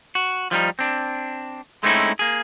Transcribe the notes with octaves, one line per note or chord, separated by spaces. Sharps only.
F#4
F3 G3 B3 D#4
C4 D4
G#3 A3 C4 C#4 D#4 E4
A#3 G#4